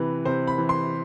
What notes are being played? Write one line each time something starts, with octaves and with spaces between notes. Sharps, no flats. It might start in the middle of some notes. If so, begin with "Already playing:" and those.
Already playing: C3 E3 B4
C3 C5
B5
E3
C6